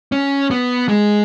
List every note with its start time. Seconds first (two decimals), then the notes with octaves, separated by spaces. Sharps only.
0.12 C#4
0.51 B3
0.88 G#3